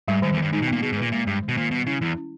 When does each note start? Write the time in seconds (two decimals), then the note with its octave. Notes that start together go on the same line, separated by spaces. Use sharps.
0.08 G#2 G3
0.22 G#2 D#3
0.33 E2
0.38 G2 D#3
0.53 G#2 D#4
0.62 B2
0.68 A#2 B3
0.82 B2 G#4
0.92 G#2
0.97 A#2 B4
1.12 A#2 G#3
1.27 G2 G#3
1.42 D#3
1.48 B2
1.57 A#2 D#3
1.71 B2 G3
1.86 C#3 E4
2.01 E2 E4
2.17 C#4